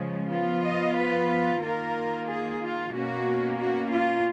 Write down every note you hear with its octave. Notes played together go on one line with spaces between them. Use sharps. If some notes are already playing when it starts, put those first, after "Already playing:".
Already playing: C#3 F3 G#3 C#4
F3 B3 F4
D#5
B4
D#3 A#3 F4 A#4
G#4
F4
B2 A#3 C#4 F#4
F#4
F4